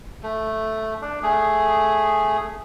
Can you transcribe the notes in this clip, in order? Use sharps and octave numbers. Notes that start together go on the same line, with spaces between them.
A3
D4
A3 G#4